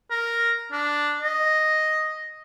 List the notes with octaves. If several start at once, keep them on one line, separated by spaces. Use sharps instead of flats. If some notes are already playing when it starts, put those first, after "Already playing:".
A#4
D4
D#5